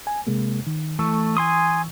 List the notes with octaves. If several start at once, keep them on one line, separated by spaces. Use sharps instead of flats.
G#5
C3 G#3 A#3
D#3
E3 A3 C#6 E6
G#5 C6 D#6